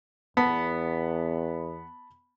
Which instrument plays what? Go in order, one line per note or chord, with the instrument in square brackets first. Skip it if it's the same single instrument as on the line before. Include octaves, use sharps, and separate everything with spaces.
[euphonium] E2 [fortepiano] B3 [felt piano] A5 B5